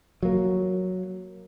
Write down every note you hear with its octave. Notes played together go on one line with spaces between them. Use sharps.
F#3 A#3